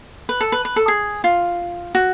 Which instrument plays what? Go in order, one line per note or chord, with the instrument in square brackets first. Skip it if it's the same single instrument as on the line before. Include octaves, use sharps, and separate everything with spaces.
[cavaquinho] B4
A4
B4
B4
A4
G#4
F4
F#4